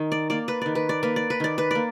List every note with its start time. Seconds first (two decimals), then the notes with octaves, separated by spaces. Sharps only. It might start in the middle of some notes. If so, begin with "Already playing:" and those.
Already playing: D#3
0.12 D5
0.30 A#3 D5
0.48 B4
0.61 D#3 D5
0.75 B4
0.89 D5
1.03 A#3 B4
1.16 D5
1.30 B4
1.40 D#3 D5
1.58 B4
1.71 A#3 D5